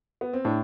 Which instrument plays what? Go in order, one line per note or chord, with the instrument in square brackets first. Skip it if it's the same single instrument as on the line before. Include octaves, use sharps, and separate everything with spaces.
[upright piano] B3
C4
[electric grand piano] A2 [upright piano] D4